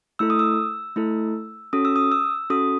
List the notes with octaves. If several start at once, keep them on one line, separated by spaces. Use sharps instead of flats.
A3 E4 A4 E6
D#6
E6
A3 E4 A4
C#4 F#4 A4 D#6
E6
D#6
E6
C#4 F#4 A4 D#6